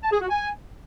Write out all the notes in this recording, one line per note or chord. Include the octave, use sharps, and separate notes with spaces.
A5
G#4
F#4
G#5